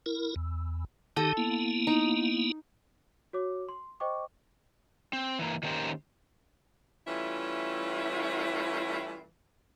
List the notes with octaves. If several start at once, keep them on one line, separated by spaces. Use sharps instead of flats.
E4 A#4
E2
D#3 D#4 G4 A4
A#3 B3 E4
D#4
F#4 C#5 D6
C6
C5 D#5 G5 C#6 D6
C4
E3 A#3
D#3 A#3 C#4 G4 A#4 C5
E3 G3 A3 C#4 E4 F4